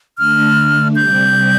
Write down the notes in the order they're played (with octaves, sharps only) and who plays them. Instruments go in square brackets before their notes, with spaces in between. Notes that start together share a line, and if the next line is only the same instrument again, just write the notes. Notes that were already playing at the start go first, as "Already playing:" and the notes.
[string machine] D3 A3 D4 [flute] F6
[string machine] C3 G3 C4 G4 D5 [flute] G6